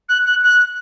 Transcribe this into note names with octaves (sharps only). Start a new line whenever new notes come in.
F#6
F#6
F#6